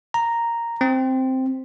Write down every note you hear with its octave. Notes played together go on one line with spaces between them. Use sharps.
A#5
C4